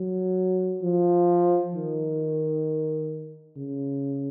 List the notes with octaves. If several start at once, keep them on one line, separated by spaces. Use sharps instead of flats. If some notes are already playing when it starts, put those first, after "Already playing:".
Already playing: F#3
F3
D#3
C#3